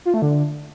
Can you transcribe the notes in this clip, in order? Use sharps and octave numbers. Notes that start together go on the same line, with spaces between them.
F4
A3
D3